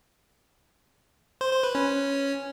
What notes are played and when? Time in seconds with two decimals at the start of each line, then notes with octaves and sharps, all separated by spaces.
1.41 C5
1.52 C5
1.63 B4
1.75 C#4